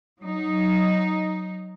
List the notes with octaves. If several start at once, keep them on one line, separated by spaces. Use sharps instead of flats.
F#3 D#4